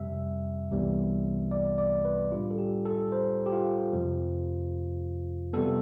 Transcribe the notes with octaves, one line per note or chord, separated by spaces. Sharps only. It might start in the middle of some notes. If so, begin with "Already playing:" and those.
Already playing: F2 C3 G3 E5
C2 C3 E3 G3 B3
D5
D5
B4
A2 G3 D4 F4
A4
G4
A4
C5
G4
F4
F2 C3 F3
C3 G3 B3 A4